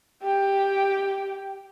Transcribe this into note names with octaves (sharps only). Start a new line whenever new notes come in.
G4 G5